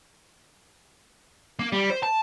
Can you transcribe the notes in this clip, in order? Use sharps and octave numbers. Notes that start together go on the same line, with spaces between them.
A#3
G3
C5
A5